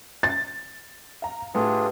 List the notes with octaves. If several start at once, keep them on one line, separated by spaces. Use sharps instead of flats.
A6
F5 A#5
A2 D4 F4 G4 G#4 B4